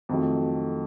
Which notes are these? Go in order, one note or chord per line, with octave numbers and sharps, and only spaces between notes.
F2 D#3 F#3 A3